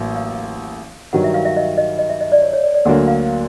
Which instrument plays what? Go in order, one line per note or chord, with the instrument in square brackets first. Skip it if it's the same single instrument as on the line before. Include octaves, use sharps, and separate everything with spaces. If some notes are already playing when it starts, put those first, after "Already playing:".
Already playing: [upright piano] A1 A2 F#3 A#3
[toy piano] F5
[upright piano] G2 D#3 F#3 [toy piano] F#5
[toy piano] E5
F5
E5
D#5
D#5
D#5
E5
D#5
D5
C#5
C#5
D5
D5
[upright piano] D2 D3 F#3 A#3 [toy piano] F#5
[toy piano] F5